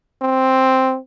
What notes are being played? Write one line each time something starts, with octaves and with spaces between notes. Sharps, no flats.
C4